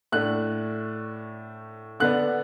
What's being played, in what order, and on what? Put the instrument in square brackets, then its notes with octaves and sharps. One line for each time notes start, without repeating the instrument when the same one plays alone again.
[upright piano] A2 A3 D4 F#6
D3 B3 D4 F#6